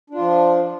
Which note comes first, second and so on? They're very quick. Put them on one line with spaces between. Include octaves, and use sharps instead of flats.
D4 F4 F3